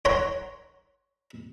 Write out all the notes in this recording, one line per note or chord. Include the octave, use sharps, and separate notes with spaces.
C#5 F#5 A#5 C6